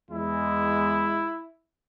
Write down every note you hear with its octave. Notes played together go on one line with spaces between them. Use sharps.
E2 G#3 E4